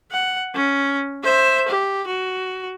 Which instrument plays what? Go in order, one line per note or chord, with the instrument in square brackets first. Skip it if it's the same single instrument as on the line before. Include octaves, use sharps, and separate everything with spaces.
[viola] F#5
C#4
C5 E5
G4
F#4